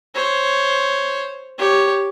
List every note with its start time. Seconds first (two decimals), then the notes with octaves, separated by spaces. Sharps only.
0.15 C5 C#5
1.58 G4 C#5